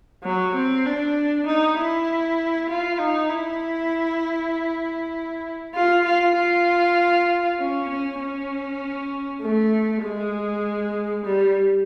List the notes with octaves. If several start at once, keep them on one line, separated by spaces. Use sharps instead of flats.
F#3
C4
D4
D#4
E4
F4
D#4
E4
F4
F4
F4
C#4
C#4
C#4
A3
G#3
G3